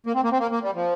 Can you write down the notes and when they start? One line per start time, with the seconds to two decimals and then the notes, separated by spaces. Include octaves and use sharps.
0.06 A#3
0.15 C4
0.24 A#3
0.32 C4
0.40 A#3
0.51 A#3
0.63 G3
0.75 F3